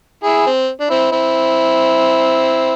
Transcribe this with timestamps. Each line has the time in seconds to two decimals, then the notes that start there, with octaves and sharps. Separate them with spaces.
0.23 E4 G#4
0.46 C4
0.80 D4
0.90 C4 E4
1.12 C4 E4